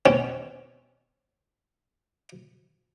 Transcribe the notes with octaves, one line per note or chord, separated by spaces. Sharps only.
B2 C4 C#4